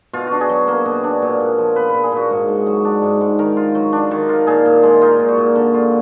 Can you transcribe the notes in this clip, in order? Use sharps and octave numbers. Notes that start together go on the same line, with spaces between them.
B2 F4
D4 F#4
G#4
F#3
A#3
B2
D4
A#2
A#2
F3
B3 B4
A#2 B4
G#4
A#2 F#4
G#2 F#4
G#2
F#3
D4
G#2
G#2
D#3 A#4
F4
F#3
D4
D#3
F4
A#2 G#4
A#2
G#3
D#4 F4
A#2
F#4
A#2
D3
F4